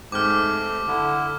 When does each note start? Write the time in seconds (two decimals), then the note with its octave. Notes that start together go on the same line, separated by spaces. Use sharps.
0.12 G#2 A3 C4 G4 D6 F6
0.88 D3 E4